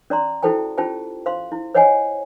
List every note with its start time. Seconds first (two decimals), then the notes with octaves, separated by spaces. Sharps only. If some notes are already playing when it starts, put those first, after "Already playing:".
0.10 C#4 D5 A#5 C6
0.43 E4 F#4 A4 C5 G5 A5
0.78 C#4 F4 G4 C5 G5 A5
1.26 C5 F5 C6
1.52 E4
1.74 C5 C#5 D#5 F#5 G#5